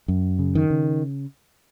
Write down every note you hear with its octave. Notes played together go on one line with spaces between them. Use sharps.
F#2
C#3
D#3
C#3